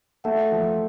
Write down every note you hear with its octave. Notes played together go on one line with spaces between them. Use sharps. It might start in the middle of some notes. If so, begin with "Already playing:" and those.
A3 E5 F#5
F3